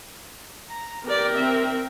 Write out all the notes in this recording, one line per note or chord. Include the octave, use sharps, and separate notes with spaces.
A#5
B3 G4 A#4 D5 G5
C4 E5